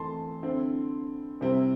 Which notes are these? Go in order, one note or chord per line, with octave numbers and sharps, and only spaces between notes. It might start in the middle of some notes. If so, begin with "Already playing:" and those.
Already playing: E3 A3 C4 A5 C6
D3 C4 E4
C3 G3 C4 E4